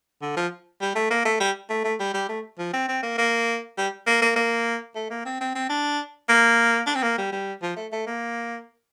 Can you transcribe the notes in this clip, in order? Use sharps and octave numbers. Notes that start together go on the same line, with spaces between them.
D3
F3
G3
A3
A#3
A3
G3
A3
A3
G3
G3
A3
F3
C4
C4
A#3
A#3
G3
A#3
A#3
A#3
A3
A#3
C4
C4
C4
D4
A#3
D4
C4
A#3
G3
G3
F3
A3
A3
A#3